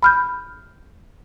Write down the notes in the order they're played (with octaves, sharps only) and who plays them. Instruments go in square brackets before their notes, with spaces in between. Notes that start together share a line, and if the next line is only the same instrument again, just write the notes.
[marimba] B5 F6 G6